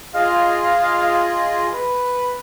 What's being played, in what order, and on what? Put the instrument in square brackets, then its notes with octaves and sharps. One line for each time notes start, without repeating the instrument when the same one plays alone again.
[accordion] F4 G#4 D#5 [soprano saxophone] F5
[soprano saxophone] B4